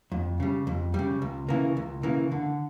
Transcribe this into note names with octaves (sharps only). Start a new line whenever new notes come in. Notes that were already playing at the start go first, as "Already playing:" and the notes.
F2
C#3 G3
F2
C#3 G3
C#2
C#3 E3 A#3
C#2
C#3 E3 A#3
D3